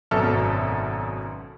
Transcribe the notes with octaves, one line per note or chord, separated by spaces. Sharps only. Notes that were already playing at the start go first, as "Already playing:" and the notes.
G#1 F#2 B2 A4 E5 F6